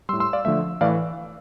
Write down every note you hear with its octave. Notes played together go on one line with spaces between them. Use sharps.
A2 G3 C6 E6
C6 E6
D5 F5
D3 F3 A3 E5
A2 E3 A3 D5 F5